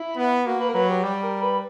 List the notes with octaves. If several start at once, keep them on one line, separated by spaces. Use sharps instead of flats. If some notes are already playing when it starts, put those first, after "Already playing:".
Already playing: E4
B3
A#3 F#4
B4
A#4
F#3 B4
G4
G3 G4
A#4
B4